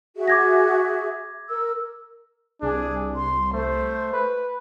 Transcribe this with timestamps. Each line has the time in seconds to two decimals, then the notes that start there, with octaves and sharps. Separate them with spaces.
0.16 F#4 G#4 E5
0.28 D6 G#6 A#6
1.49 A#4 E6
2.62 C2 D4 G#4
3.15 C6
3.53 A3 C5
4.13 B4